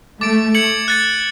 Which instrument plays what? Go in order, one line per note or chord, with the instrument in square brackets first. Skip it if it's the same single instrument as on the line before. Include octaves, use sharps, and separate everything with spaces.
[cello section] A3 [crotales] D6 A6 D7
[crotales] G#6 C#7 F#7
F#6 A6 C#7